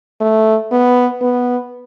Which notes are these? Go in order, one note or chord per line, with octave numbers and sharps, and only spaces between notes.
A3
B3
B3